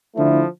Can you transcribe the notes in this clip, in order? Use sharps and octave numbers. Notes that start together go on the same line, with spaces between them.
D3 F3 A3 E4